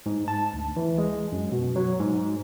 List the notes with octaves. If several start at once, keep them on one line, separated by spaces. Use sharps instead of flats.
G#2
A5
D2
E3
G#3
F#2
B2
F#3
G#2